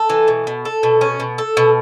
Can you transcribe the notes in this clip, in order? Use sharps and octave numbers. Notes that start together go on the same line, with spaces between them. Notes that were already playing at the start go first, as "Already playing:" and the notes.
Already playing: A4
E3
B2
B2
A4
B2
C#4
B2
A4
B2